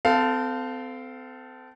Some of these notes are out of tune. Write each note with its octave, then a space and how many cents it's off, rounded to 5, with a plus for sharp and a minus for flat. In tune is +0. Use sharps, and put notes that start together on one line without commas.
C4 -35 A4 +0 F5 +0